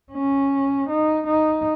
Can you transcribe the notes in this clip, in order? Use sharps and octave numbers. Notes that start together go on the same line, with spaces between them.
C#4
D#4
D#4